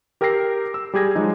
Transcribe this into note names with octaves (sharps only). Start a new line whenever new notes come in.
G4 A#4 G5 E6 A#6 C7
E6
G3 G4 G#4 G#6 A#6
F3 F#3 G#3 D#4